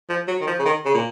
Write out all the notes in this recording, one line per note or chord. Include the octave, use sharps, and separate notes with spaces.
F3
F#3
D#3
F3
C#3
D#3
C#3
A#2